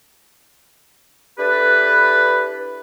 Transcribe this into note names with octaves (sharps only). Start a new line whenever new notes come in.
D4 E4 G4 A4 B4